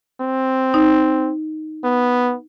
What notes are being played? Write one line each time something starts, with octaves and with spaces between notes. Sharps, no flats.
C4
D#4
B3